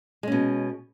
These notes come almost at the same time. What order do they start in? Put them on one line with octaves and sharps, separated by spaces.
G#3 C#4 B2